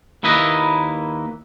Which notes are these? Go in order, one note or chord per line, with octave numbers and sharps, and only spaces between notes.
D#2 A#3 E4 B4 D#5